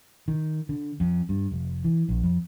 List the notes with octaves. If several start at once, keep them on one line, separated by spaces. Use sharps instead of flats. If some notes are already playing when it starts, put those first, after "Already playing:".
D#3
D3
F2
G2
F1
E3
A#1
F2